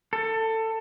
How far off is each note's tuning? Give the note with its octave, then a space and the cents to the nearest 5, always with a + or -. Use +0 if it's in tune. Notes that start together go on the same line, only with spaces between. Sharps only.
A4 +20